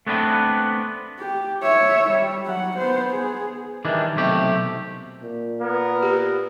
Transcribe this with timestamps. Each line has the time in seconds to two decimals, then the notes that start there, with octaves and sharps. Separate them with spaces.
0.07 A3 B3 C4 D4 B4
1.19 G4
1.63 C#5 E5
2.11 G3
2.46 F#3 F#5
2.78 B3 C5
3.10 G#4
3.85 D#3 E3 G3 D4
4.16 B1 C3 A3 G4
5.24 A#2
5.61 B3 A#4
6.03 G4